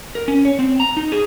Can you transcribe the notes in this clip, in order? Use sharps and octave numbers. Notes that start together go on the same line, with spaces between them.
A#4
C#4
C#5
C4
A#5
D#4
G#4